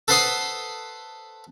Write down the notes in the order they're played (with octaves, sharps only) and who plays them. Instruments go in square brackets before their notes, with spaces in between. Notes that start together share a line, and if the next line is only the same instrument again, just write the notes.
[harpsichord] A4 B4 C5 F#5 C6 D#6